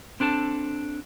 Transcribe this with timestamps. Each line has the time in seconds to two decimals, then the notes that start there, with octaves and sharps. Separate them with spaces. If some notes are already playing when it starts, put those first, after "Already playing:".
0.20 C4 D4 A4 A5